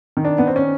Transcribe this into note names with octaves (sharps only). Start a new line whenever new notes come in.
D#3
D4
D#3 B3
C4
C#4